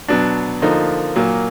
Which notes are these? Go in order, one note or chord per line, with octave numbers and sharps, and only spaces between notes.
B2 F#3 B3 D4
D3 F3 A#3 D#4
A#2 F#3 A#3